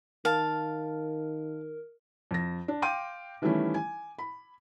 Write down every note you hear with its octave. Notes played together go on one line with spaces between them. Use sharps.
D#3 A#4 F5 A5
F2 A#6
D4
F5 G5 C6 D6 D#7
D#3 E3 G3 A3 C#4 E4
G#5
B5